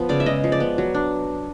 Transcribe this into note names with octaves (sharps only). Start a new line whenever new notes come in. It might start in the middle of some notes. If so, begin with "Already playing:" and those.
Already playing: F3 B3
C#3 D5
E5
G#3 D#5
F3
D5
B3
F#3
D4